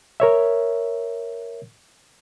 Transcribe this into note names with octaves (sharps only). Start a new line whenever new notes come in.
A#4 C#5 E5